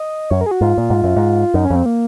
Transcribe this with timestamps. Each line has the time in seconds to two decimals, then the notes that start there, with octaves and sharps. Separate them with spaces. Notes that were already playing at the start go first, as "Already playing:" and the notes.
Already playing: D#5
0.31 F#2 C#5
0.41 A#4
0.46 G#4
0.51 F#4
0.61 G#2 F4
0.78 A#2
0.90 G#2
1.04 F#2
1.16 G#2
1.54 F#2 D#4
1.65 C#4
1.70 F2
1.75 C4
1.86 A#3